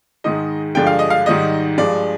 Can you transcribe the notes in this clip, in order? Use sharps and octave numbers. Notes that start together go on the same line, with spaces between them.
G#2 D#3 G#3 D#5
G2 D3 F3 G#3 G5
F5
D#5
F5
G#2 D#3 G3 D#5
G2 F3 G#3 D5